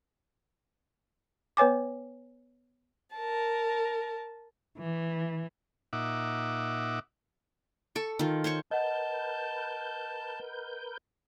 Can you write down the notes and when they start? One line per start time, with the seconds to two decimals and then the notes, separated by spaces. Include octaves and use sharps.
1.57 B3 B4 C#5 G#5 D6
3.15 A#4 A5
4.78 E3
5.93 A#2 D#4 E5 F#5 D6
7.95 A4 C#6
8.19 D#3 F4
8.44 C5 C#5 C6 C#6
8.71 A#4 B4 D#5 F#5 A5 G6